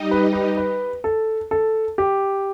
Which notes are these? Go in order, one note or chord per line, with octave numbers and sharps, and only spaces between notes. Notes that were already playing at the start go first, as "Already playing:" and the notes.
Already playing: G3 D#4 G4 D#5
B4
B4
B4
A4
A4
G4